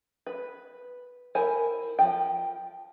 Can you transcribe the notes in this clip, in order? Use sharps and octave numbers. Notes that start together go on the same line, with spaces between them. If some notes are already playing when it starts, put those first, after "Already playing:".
B4
E4 A#4 C5 G#5
F3 G5